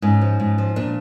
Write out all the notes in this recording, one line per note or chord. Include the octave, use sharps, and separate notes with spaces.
G#2 C#4
F3
G#2
F3
A#2 D4